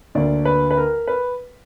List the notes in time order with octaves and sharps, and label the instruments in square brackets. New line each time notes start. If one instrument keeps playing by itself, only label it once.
[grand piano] D2 D3 A#3 D5
B4
B4
A#4
B4